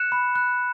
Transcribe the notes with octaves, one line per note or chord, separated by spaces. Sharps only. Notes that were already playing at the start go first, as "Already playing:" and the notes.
Already playing: F#6 C#7 E7
B5
F#6